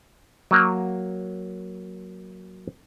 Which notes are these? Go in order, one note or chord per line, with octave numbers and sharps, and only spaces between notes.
F#3 A#3